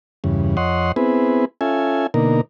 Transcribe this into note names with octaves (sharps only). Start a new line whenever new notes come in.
E2 G2 C#3
F2 C#5 D#5 F#5 C6
B3 C4 E4 G#4 B4
C#4 F4 A4 E5 G#5
B2 D3 A#3 D#4 A#4